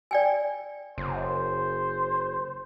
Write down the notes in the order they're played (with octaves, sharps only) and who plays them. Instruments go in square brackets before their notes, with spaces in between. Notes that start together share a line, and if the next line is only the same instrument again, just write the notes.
[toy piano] D5 G5 G#5
[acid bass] F#1 [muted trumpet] C5